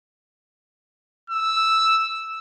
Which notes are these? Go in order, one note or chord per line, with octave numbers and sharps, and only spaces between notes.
E6